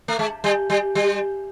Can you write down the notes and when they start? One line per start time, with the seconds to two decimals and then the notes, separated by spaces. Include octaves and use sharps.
0.08 A3
0.19 G#3
0.44 G3
0.70 G3
0.95 G3